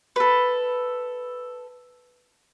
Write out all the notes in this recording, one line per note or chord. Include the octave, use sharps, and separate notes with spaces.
A4 B4